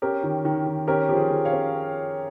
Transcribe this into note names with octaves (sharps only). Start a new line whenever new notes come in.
C#4 G4 A#4
D#3
D#3
D#3
C#4 G4 A#4
F3 G4
G#4
F3
C#5 F5
C#4